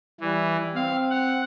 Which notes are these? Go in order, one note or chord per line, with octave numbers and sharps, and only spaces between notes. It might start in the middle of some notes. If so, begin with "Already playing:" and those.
E3 G3
C4 F5
F#5